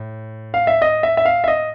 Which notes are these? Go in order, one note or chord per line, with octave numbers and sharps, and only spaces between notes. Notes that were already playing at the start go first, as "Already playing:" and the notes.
Already playing: A2
F5
E5
D#5
E5
E5
F5
E5
D#5